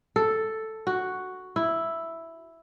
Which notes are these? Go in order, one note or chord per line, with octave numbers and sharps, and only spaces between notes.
A4
F#4
E4